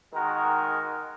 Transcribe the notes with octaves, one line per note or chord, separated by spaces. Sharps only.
D#3 G#3 D#4 F#4 A#4